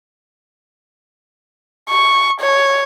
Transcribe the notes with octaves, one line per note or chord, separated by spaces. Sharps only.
C#6
C#5